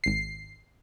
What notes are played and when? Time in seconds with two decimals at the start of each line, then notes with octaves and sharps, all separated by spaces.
0.04 G#1 C7